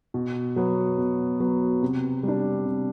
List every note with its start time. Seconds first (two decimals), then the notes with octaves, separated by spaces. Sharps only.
0.14 B2
0.56 F#3 B3
0.98 B2
1.40 F#3 B3
1.82 C3
2.23 G3 D4
2.65 C3